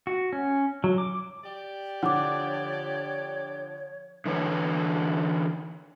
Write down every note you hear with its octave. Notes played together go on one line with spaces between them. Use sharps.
F#4
C#4
F#3
D6
G4 D5
D3 F3 C#5 F#5 D6
D3 E3 B4 C#5